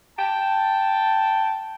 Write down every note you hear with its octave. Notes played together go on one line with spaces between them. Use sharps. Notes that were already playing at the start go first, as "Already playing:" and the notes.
G5 A5